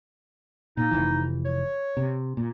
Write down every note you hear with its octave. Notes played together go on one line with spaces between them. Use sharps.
A#2 D#4
F1 C#2 E3
C#5
C3
A#2